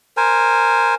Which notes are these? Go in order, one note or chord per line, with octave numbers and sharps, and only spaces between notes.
A#4 C5 G#5